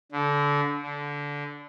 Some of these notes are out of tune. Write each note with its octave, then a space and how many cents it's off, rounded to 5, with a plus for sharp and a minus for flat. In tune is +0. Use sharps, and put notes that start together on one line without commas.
D3 -25
D3 -20